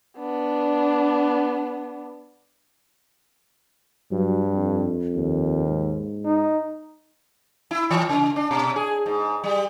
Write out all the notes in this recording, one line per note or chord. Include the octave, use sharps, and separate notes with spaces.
B3 D4
G2 F#3
F2
D#2
G#2
D#4
E4
E3
C#3
D4
B2
G#4
G#2
G3